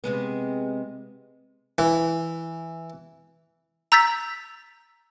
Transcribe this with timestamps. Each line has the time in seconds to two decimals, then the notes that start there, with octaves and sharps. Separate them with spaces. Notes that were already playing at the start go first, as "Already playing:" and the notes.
0.04 C3 G#3 B3
1.78 E3
3.92 A#5 E6 G6 A6 B6